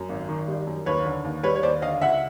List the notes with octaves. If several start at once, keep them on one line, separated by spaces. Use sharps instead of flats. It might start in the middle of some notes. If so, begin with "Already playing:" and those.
Already playing: F#2
G#1
D#3
G3
F#2
D#2 B4 C#5
D3
D#2
G3 B4 C#5
C#5
D#2 C5 D5
D3 D#5 F5
C#2 E5 F#5